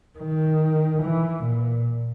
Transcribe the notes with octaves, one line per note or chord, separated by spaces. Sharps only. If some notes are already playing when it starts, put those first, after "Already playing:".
D#3
E3
A#2